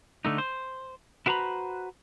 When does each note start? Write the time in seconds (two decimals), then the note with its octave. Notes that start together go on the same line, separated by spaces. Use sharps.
0.25 D3 A3 D#4
0.38 C5
1.26 E4 F#4 B4 C5 A#5 B5